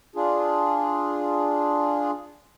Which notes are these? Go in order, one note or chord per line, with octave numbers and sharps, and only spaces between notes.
D4 F4 G#4